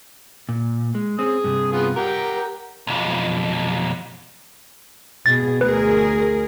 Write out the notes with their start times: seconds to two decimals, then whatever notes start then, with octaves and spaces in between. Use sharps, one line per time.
0.49 A#2
0.95 G#3
1.19 C4 C#4 G#4 D#6
1.44 G2 C3
1.72 B3 F4 G#4
1.96 G4 A#4 F#5 A#5
2.87 B1 F2
5.26 B2 G#4 A6
5.61 D2 G#4 A#4 B4